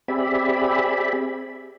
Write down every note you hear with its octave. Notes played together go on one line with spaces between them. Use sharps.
C4 G4 G#4 D5 E5 B5